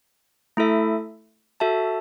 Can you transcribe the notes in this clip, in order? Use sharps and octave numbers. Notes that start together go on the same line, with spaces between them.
A3 E4 A4 E5
F#4 A4 E5 A5